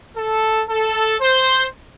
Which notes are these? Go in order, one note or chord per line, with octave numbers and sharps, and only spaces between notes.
A4
A4
C5